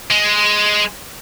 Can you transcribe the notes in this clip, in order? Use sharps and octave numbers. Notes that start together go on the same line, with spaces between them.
G#3